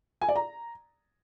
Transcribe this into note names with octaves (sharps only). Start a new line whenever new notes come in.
G#5
D5
A#5